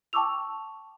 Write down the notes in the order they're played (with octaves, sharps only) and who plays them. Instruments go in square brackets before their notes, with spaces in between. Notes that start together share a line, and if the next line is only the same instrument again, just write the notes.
[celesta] G5 A5 C#6 D6 E6 F7